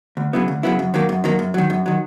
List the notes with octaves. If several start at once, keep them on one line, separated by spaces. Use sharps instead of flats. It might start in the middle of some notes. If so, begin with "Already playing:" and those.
D2
C#3 F#3 B3 E4
D2
C#3 F#3 B3 E4
F#2
D#3 F#3 A#3
F#2
D#3 F#3 A#3
F#2
D#3 F#3
F#2
D#3 F#3